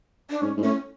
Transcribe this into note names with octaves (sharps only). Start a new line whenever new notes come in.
D4
G#2 C#4
G#2
A2 C#4